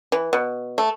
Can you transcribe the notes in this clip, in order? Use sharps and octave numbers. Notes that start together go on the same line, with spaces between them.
E3
B2
A3